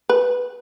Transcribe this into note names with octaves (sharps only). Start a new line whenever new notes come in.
B4